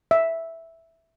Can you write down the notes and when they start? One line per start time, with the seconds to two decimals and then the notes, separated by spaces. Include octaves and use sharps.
0.11 E5